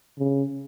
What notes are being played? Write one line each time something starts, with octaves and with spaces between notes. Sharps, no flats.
C#3